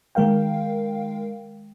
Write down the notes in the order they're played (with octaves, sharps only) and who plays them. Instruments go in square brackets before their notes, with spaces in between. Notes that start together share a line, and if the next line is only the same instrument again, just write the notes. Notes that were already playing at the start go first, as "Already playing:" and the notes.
[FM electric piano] D#3 G#3 A#4 F5 G5